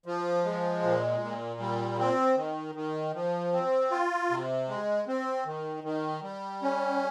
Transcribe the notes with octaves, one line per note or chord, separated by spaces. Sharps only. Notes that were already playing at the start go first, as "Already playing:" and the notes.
F3
G#3
A#2
A#2
G3
C4
D#3
D#3
F3
C4
F4
C3
G#3
C4
D#3
D#3
G3
C#4